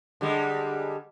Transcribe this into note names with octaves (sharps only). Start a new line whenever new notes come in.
D3 G3 G#3